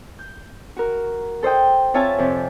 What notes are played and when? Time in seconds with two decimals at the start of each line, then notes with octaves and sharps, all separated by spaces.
0.19 G6
0.77 F#4 A#4
1.43 A4 C5 D#5 G5
1.94 C4 F4 C#5 E5 G#5 A5
2.18 F2 C3